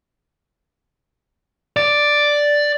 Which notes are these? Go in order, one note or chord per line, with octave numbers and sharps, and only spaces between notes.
D5